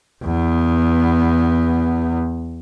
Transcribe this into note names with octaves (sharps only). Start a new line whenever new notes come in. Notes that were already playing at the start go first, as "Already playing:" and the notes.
E2 B3